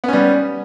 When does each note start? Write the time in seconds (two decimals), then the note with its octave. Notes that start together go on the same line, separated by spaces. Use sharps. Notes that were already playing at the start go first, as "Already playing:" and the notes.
0.04 B3
0.08 C#4
0.13 G3